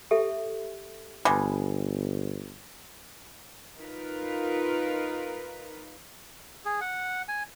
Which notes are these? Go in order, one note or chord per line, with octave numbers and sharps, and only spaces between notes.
G4 A4 E5
G1 B2 G3 G#3
D#4 F4 A#4 B4
G#4
F#5
G#5